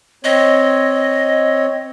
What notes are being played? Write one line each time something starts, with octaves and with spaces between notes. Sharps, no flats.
C4 C#5 D#5